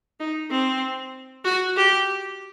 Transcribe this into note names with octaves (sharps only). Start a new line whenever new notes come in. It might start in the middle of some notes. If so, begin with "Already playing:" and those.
D#4
C4
F#4
G4